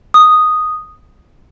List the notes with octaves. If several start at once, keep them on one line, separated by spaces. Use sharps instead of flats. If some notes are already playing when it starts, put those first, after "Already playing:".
D#6